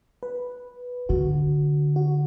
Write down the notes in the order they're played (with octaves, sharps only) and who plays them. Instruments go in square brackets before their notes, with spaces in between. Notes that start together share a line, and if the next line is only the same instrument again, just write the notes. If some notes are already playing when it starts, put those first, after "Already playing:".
[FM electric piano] B4
[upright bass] D3 [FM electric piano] F#4
[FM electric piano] F#4